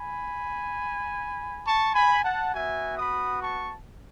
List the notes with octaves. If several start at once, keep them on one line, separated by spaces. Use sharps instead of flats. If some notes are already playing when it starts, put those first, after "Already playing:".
Already playing: G#5 B5
A5 C#6
G#5 B5
F#5 A5
B3 F#4 E5 G#5
B5 D#6
A5 C#6